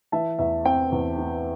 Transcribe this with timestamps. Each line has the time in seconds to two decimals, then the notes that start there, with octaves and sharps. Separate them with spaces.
0.12 E3 E5 A5
0.39 E2 E5
0.65 C4 G5
0.92 E2
1.18 E3